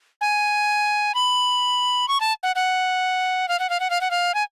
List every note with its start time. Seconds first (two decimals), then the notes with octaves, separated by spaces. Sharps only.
0.21 G#5
1.15 B5
2.08 C#6
2.20 A5
2.43 F#5
2.56 F#5
3.49 F5
3.59 F#5
3.70 F5
3.80 F#5
3.90 F5
4.01 F#5
4.11 F5
4.34 G#5